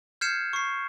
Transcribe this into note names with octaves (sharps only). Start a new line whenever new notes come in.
F6 G6 G#6 C7 C#7 E7
C#6 C7